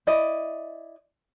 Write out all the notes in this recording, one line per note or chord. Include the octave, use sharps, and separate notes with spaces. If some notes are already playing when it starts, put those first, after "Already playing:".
E4 D5 D#5